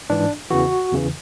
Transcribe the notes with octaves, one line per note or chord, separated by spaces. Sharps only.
G#2 E3 D4
E2 C#3 E3 F#4
E2 C#3 E3